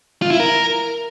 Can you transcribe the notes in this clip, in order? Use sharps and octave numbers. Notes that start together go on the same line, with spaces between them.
F4
E4
A#4